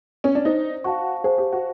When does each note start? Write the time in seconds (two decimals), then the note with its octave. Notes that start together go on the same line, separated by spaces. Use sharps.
0.24 C#4
0.35 D4
0.45 D#4 C5
0.84 F#4 F5 A5 C#6
1.24 G#4 C5
1.38 G4
1.52 F#4